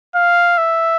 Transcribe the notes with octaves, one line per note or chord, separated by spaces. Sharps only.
F5
E5